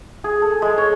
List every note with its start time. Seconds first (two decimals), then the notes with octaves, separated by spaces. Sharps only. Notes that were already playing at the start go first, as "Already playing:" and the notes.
0.24 G#4
0.42 A4
0.62 G#3
0.78 C#5